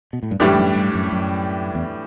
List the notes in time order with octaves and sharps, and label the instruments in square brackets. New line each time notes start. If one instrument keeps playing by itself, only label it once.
[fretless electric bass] B2
A2
G2
[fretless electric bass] F#2 [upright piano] A2 E3 G3 D4 G4
[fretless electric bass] F#2
G2
F#2
F#2
E2